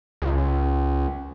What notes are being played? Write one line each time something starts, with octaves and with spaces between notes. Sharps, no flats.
C#2